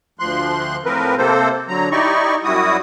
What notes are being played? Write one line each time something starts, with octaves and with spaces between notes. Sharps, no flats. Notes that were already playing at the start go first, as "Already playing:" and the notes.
D2 F3 C6 F#6
A2 F3 C4 A#4 B4
C3 A#3 C4 A4 C5
D3 F#3 A#5
D#4 E4 G4 D5 D#5 C#6
F#2 G3 E4 F#4 D#6